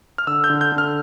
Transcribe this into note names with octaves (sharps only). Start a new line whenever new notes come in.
F6
D3 E6
G6
D3
G6
D3
F6